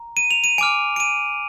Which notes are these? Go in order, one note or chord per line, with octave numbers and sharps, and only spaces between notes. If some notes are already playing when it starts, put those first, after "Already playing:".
Already playing: A#5
D#7
F7
D#7
G#5 D6 F6 D7
D7
D#7